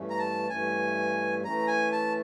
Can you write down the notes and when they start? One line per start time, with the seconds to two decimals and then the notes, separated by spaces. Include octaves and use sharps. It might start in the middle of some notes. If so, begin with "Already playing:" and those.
Already playing: G2 E3 A3 C#4
0.10 A#5
0.19 A5
0.50 G2 E3 A3 C#4 G#5
1.44 E3 A3 C#4 A#5
1.68 G#5
1.92 A5